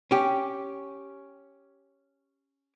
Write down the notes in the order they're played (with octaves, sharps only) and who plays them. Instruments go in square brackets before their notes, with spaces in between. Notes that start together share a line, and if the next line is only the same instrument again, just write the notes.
[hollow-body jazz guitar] C#4 G4